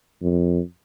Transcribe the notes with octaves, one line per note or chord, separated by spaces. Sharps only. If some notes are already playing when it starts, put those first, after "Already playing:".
F2